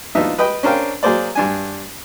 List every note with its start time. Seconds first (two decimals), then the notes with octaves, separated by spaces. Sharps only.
0.15 F3 B3 D4 D#4 F4 E5
0.38 B4 D#5 G5 B5
0.63 C#4 D4 A#4 C5 F5 G5
1.03 F#3 A#3 G#4 C5 D5
1.35 G2 D4 G#5